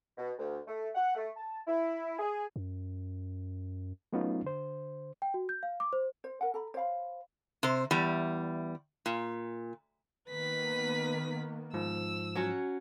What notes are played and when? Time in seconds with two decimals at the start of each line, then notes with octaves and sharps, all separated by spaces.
0.18 B2
0.39 D2
0.68 A3
0.95 F#5
1.15 A3
1.37 A5
1.68 E4
2.19 G#4
2.56 F#2
4.13 F#3 A3 B3 C#4 D#4 F4
4.44 D3 C5
5.22 G5
5.34 F#4
5.49 G6
5.63 F5
5.80 D6
5.93 C5
6.24 C5
6.41 A#4 F#5
6.54 A4 A#5 B5
6.74 C5 C#5 F5 B5
7.63 C3 C5
7.91 E2 G3
9.06 A#2
10.29 D#3 A#3 B3 B4 B6
11.74 G#2 F3 E6
12.35 F#3 C#4 F#4